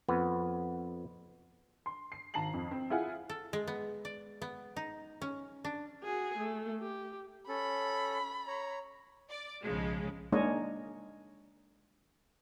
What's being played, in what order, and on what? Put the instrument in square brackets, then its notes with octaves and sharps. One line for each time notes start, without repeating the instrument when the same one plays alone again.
[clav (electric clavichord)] F2 B3
[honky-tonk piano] C6
C7
G#1 A5 A#5 C7 F#7
F2
C4
E4 F4 G#4 F#5 G#5
[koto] A4
G#3
B3
D5
B3
D#4
C#4
D4
[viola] F#4 G#4
A3
G4
[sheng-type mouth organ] C#4 A4 [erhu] B5
[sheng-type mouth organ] C#5 A#5
[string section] D5
B1 G#2 C#3 F3 G#3
[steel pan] G#3 A#3 D4 D#4 C#5 D#5